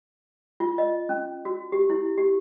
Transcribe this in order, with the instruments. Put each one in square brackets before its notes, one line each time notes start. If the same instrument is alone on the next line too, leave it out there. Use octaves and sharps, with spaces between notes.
[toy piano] F4
D#5
C#4
F#4
G4
E4
G4